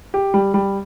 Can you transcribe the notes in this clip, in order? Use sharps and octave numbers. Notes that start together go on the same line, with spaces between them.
G4
G3
G3